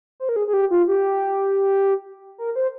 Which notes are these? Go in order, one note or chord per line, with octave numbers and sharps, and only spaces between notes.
C5
A#4
G#4
G#4
G4
F4
G4
A#4
C5